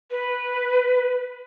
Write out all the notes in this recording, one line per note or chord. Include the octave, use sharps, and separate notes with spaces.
B4